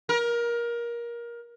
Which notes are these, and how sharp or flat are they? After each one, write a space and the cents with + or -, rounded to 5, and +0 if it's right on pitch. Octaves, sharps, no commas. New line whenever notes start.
A#4 +20